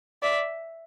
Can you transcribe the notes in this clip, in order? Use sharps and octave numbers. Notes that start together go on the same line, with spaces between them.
D5 E5